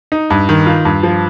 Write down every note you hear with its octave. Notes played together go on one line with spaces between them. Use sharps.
D#4
G2
D#3
F4
G2
F3